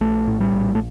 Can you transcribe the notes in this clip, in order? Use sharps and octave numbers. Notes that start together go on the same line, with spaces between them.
A#1 A3
A2
G3
A#1
A3